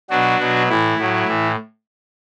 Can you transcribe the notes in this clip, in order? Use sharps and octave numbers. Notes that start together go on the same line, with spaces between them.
B2 F#3 D4 F#4
B2 F#3
A2 E3 E4
A2 F#3
A2 E3